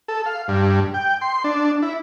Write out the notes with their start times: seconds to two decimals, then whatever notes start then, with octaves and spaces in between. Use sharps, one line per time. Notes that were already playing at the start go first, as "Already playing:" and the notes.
0.08 A4
0.26 F5
0.48 G2
0.94 G5
1.21 C6
1.44 D4
1.82 E4